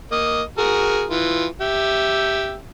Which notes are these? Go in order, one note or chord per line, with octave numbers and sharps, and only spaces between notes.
A#3 D#5
F#4 G#4 A#4
E3 F4
G4 E5